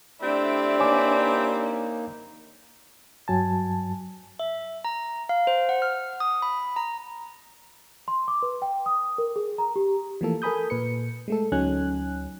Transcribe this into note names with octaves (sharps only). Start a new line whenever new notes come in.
A3 C4 D4 E4 G4 D5 E5
A#3 D#4 C#5 G#5 D6
G2 F#3 G#5 A5
E5
A#5
F5
C5
F#5
F6
D#6
B5
A#5
C6
D6
B4
G5
D#6
A#4
G#4
A#5
G4
E3 F3 A3 A#3 A4
A4 A#4 G#5 B5 D#6 G6
A#2 B4 C#7
G#3 A3 A4
D2 F#3 C#4 D#4 G#5 F#6